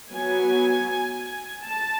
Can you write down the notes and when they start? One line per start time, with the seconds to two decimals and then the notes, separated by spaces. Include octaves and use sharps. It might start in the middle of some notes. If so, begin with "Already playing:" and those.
0.11 F#3 B3 G#5
1.64 A5